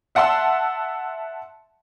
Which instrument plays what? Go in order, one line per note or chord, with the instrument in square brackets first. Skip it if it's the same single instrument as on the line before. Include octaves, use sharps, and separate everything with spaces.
[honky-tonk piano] E5 F#5 A5 C6 E6